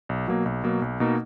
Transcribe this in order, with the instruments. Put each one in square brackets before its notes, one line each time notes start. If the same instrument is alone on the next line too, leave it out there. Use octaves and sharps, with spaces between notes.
[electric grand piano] B1
B2 F#3 A#3
B1
B2 F#3 A#3
B1
B2 A#3 D#4